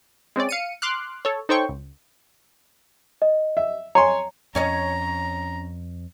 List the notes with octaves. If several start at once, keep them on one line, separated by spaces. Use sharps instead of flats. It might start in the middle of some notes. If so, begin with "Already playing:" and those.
G#3 C4 C#4 D5
F5 C#7 D#7
C6 D6 F6 F#6
A4 C#5
D#4 A4 C5 C#5 G5 C#6
C#2
D#5
E5
C#5 G#5 A#5 C6
F2 C#4 C#5 D#5 A#5